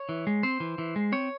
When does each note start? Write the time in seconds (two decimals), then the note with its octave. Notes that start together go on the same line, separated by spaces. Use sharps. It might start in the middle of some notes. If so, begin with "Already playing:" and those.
Already playing: C#5
0.09 E3
0.27 G#3
0.43 C4 C5
0.60 E3
0.78 E3
0.96 G#3
1.12 C4 C#5